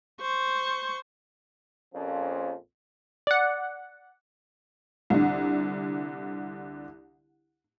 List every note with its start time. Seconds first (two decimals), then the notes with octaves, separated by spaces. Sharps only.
0.21 C5 C#6
1.94 A#1 F2 A#2 F3 C#4
3.27 D5 F#5
5.10 C2 D3